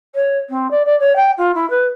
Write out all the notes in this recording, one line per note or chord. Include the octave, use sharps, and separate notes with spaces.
C#5
C4
D5
D5
C#5
G5
F4
E4
B4